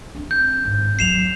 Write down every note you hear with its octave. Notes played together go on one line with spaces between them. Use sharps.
C4 D4
G6
G#1
D#2 F#3 C7 E7 F7